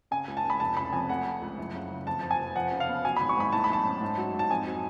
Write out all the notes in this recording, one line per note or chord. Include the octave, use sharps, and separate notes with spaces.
C#3 G#5
C#2
A5
C#2
B5
F1 A5
C#3 B5
F2 G#5
A3 F#5
A3
C#2
F#1
C#3
F#1
F2 A5
F3 A5
G#5
F1
F3 F#5
C#3
F5
B3
F#3 G#5
G#1 B5
C#6
G#2 B5
A2 A5
B5
B1 A5
C#4
G#2
F#3
G#2 A5
F2 G#5
F#3